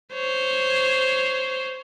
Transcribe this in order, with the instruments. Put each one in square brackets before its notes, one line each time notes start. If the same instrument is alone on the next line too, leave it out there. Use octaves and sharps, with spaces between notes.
[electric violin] C5 C#5